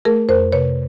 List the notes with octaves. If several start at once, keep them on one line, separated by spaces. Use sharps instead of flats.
A3 G#4 A#4
F2 A#4 C5
C3 B4 C#5